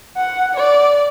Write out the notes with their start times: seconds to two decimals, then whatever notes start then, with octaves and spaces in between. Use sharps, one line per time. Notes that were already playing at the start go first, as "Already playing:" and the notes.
0.17 F#5
0.56 D5